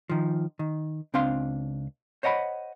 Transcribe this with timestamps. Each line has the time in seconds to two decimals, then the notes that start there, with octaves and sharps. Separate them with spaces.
0.10 D#3 F3
0.59 D#3
1.14 C#2 C4 D4 F5 C6
2.23 C5 C#5 D#5 F#5 A#5 B5